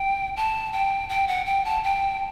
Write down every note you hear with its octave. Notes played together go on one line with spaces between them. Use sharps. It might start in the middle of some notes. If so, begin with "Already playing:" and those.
Already playing: G5
A5
G5
G5
F#5
G5
A5
G5